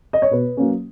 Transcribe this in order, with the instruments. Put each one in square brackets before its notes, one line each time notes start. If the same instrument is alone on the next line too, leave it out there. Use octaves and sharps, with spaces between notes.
[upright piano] D#5
C#5
B2 B4
F#3 A#3 C#4